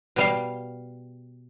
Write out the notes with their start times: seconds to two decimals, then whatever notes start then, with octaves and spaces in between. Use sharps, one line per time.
0.16 B2 G3 F5